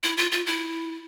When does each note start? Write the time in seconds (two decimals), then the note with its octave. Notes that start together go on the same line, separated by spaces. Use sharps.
0.03 E4
0.17 F4
0.32 F4
0.46 E4